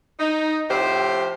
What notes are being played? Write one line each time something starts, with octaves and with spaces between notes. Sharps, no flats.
D#4
F2 A2 G4 C5